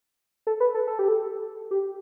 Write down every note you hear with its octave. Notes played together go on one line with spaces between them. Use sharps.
A4
B4
A4
A4
G4
A4
G4